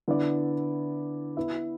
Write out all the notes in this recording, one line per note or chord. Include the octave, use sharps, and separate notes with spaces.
D3 B3 E4 D5
B3 E4 B4 E5